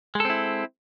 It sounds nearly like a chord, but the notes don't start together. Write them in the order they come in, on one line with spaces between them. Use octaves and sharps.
G#3 A4 C4 E4